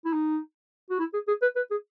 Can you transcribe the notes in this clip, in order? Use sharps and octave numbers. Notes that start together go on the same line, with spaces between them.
E4
D#4
F#4
E4
G#4
G#4
B4
B4
G#4